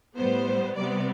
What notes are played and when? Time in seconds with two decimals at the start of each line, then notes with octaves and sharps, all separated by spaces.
0.16 A2 G3 B3 C5
0.76 C3 G3 B3 D5